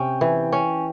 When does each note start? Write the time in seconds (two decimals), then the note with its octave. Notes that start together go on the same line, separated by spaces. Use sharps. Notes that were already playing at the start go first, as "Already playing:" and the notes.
Already playing: C3 C#4 G5
0.21 E3
0.52 C#4